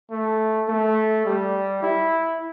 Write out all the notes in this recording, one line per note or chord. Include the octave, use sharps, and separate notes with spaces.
A3
A3
G3
E4